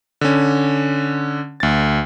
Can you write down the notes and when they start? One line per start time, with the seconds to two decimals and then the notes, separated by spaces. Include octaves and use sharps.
0.21 D3 C#4
1.60 D2 A6